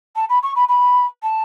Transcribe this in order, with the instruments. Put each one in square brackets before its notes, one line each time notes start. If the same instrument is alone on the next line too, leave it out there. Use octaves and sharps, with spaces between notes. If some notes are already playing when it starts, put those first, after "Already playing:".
[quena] A5
B5
C#6
B5
B5
A5